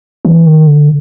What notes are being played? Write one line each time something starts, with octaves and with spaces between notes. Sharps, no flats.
E3
D#3
D3